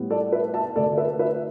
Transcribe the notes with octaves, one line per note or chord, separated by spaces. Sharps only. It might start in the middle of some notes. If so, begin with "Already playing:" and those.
Already playing: A2 G3 B3
A4 D5
B4 E5
E5 A5
D2 D3 A3 A4 D5
B4 E5
B4 E5